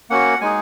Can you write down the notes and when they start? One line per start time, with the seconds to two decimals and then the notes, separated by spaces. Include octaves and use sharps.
0.10 A#3 C#4 F#4 F#5
0.41 G#3 D#4 G#4 G#5